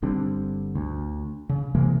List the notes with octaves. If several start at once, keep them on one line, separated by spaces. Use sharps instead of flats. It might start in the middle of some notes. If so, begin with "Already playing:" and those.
G1 D3 G3 C4
D2
C#3
C3 E3 G#3 A#3